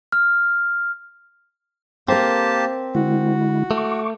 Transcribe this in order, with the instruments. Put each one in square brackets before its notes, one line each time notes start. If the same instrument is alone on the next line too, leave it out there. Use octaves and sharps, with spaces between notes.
[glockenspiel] F6
[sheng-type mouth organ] A#3 G4 A5 [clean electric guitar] C4 [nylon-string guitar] A#4 C5
[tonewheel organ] D3 G#3 E4 [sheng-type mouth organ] F#4
[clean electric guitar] A3 [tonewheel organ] C#6 D6